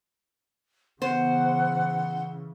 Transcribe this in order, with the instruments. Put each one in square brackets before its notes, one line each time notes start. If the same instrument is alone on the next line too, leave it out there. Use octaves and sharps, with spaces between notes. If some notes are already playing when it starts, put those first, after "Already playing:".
[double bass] C#3 E3 [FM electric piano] B3 [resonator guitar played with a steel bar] C5 [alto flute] F#5